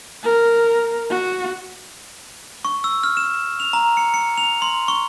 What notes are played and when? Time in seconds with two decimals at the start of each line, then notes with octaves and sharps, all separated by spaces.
0.23 A#4
1.10 F#4
2.65 C#6
2.84 E6
3.04 F6
3.17 E7
3.60 F7
3.73 A#5
3.97 C#7
4.14 C#7
4.38 F7
4.62 C6
4.88 C#6